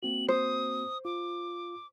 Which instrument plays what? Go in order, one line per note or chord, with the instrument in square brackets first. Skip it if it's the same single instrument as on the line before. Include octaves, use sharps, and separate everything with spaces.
[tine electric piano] A#3 C4 F#4 [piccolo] F#7
[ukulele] C5 [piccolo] D#6
[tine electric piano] F4 [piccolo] D6